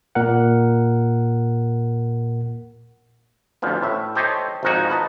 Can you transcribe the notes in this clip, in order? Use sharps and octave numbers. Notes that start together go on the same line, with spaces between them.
A#2 A#4 F#5
A1 D2 F3 B3
A2 E5
G4 A4 C5 C#5 D#5
G#1 F2 F3 D#4 F#4 G#5
B4 D#5 A5 A#5